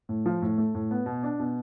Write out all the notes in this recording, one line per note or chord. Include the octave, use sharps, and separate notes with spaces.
A2
F3
A2
A3
A2
B3
B2
D4
B2